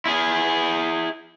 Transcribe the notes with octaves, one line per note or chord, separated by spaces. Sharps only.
E4 G#4